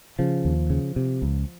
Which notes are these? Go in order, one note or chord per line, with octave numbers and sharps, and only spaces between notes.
C#3 F3
D#2
C#3
C3
C#2